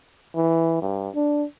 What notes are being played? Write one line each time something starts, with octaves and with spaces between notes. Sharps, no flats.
E3
G2
D4